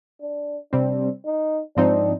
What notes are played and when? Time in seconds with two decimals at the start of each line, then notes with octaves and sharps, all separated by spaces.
0.21 D4
0.72 C3 G3 C4 D4
1.25 D#4
1.76 G#2 F3 C4 D4 D#4